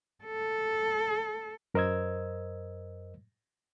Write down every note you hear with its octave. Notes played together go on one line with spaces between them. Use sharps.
A4
F#2 A#4 C5 D#5 E6 G#6